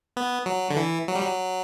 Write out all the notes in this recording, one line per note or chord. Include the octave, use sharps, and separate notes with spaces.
B3
F#3
D3
E3
F#3
G3
F#3